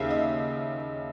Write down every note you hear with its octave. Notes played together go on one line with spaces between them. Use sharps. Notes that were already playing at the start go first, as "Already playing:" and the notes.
Already playing: D#2 C#3 E5 F5
D#5